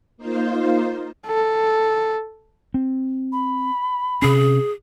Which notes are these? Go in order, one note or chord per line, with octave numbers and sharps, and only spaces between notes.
A#3 D#4 F4 C5
A4
C4
B5
C3 C#4 G#4